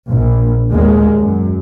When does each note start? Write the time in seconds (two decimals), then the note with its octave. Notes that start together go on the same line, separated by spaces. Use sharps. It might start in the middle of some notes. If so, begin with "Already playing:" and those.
0.10 A#1
0.71 D#2 A#2 G#3 A#3
1.20 F#2